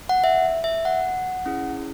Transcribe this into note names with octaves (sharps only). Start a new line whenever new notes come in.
F#5
E5
E5
F#5
C#4 E4 G#4